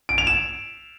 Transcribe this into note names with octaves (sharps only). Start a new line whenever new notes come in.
D7
F7
E7